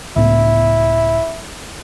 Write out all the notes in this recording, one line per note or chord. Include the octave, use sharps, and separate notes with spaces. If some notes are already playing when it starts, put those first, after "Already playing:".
C#2 A2 B3 E4